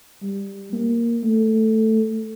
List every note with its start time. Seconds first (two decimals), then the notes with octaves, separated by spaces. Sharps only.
0.22 G3
0.73 A#3
1.24 A3